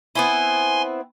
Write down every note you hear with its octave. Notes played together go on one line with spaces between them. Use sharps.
B3 C4 E4 G#5 C6